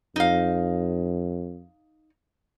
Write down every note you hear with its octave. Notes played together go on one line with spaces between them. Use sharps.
F2 D#4 F5